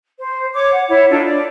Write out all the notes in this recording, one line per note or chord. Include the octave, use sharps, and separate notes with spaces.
C5
C#5 D6
F#5
E4 C#5
D4 D#4 F4 A4
D5